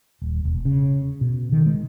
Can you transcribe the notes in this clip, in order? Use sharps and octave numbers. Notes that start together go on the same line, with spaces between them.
D#1
E1
C#3
B2
D#3
G#3